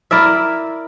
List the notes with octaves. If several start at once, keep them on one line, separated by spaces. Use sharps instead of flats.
E4 A#4 D5 E5